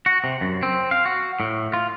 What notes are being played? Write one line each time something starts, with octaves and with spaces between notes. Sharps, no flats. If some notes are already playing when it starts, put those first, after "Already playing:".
F#4
C3
F#2
C4
F5
F#4
A2
F4